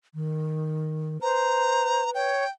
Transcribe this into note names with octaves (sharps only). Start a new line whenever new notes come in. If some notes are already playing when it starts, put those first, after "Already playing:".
D#3
B4 C5 A#5
C#5 G5